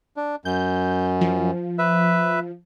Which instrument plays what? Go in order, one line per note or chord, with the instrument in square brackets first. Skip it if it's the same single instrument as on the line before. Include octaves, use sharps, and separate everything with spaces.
[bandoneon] D4
[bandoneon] F#2 [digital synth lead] G6
[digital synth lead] F3
[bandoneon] B4 E5